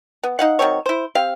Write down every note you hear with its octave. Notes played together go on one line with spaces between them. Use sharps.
B3
D#4 F5 F#5
D#3 F#3 C4 C#5
E4 C5
C4 G4 F5